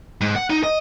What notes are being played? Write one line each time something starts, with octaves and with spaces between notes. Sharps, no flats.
G#2
F#5
D#4
D#5